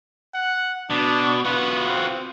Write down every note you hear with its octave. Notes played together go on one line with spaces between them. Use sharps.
F#5
B2 D4
B3 F4 F#4
C4